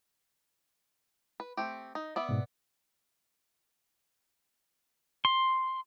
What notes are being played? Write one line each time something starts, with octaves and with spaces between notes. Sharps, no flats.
B4
A3 C4 G4
D#4
B3 D5 E5
G#2 B2
C6